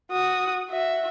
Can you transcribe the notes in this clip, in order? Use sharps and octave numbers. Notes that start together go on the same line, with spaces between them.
F#4 D#6
F#4 E5